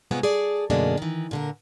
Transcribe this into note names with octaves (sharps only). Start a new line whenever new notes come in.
C3 G#3 B3 C#4 F4
G#4 A4 D5
F#2 B2 D3 G#3 A#3 D4
D#3 E3
A#2 D3 A#4